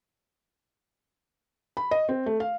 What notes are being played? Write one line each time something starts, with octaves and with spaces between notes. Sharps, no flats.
B5
D#5
C4
A3
F5